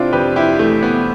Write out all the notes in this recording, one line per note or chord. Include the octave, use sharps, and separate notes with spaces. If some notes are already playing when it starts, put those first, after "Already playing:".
Already playing: C3 C4 D4 E4 F4
F2 G4 B4
E4 G4
E3 A3
B3